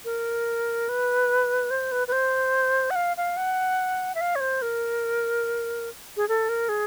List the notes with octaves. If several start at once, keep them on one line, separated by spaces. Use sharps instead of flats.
A#4
B4
C5
B4
B4
C5
F#5
F5
F5
F#5
E5
F5
C#5
C5
A#4
G#4
A4
A#4
G#4